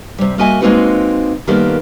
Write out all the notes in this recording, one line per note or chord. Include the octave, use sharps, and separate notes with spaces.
C3 G3
A#3 F#4 D#5 E5 G#5
G#3 A#3 C4 D#4 F#4 B4
D#3 G3 A#3 B3 A4 C5